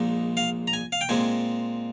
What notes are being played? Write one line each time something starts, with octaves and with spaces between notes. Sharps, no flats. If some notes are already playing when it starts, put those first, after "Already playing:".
Already playing: A#1 A#2 G#3 D#4
F5
A#5
G#5
F5
G5
A#2 G#3 C4 G#5